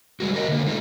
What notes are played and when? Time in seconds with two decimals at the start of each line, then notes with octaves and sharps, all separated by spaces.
0.20 G3 G#3 F#4
0.34 F#4 G4 A#4 C#5 D#5
0.48 D3 G3 A#3
0.66 G#3 D#4 F4 G#4 A4